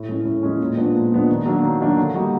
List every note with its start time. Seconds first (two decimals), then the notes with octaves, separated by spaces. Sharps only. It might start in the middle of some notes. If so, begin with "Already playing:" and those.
Already playing: A2
0.09 E3 G#3 C#4
0.25 A2
0.43 E3 G#3 C#4
0.60 A#2
0.77 F3 G#3 B3 D4
0.94 A#2
1.12 F3 G#3 B3 D4
1.29 D#3
1.46 F#3 A#3 D4
1.63 D#3
1.80 F#3 A#3 D4
1.97 D3
2.14 G3 A#3 D#4 F#4